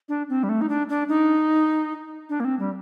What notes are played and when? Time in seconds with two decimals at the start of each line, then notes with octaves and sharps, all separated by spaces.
0.09 D4
0.29 C4
0.43 G3
0.49 A3
0.61 D#4
0.69 D4
0.89 D4
1.09 D#4
2.30 D4
2.40 A#3
2.45 C4
2.59 G3